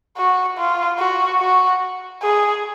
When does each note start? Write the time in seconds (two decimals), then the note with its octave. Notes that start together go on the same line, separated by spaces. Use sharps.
0.17 F#4
0.58 F4
0.98 F#4
1.40 F#4
2.22 G#4